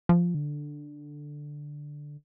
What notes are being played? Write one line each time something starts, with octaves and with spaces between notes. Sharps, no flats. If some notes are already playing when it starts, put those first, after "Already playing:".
F3
D3